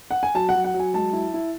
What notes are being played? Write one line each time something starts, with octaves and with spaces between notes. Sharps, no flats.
F#5
G#5
F#3 A5
F#5
F#3
F#5
F#3
G#5
G#3 A5
E4
E4